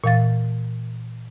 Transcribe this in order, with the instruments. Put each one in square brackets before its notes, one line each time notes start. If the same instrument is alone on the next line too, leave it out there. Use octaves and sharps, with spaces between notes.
[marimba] A#2 E3 F5 A6